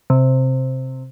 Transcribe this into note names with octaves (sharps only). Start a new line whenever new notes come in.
C3